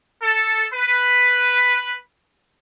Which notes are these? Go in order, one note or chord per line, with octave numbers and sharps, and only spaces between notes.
A4
B4